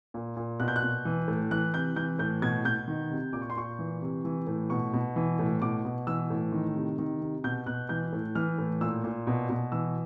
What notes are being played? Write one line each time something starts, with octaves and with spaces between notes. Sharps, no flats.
A#2
A#2
B2 F#6
G6
F#6
B2
E3
A2
E3 F#6
C3 G6
E3 G6
A2 G6
B2 G#6
B2 G6
D#3
C3
A#2 D6
C#6
C6
A#2 C#6
E3
C3
E3
A2
B2 C#6
B2
E3
A2
B2 D6
B2
E3 E6
A2
D#3
C3
D#3
C3
B2 G6
B2 F#6
E3 G6
A2
E3 F6
A2
A#2 E6
A#2
B2
B2
E3 E6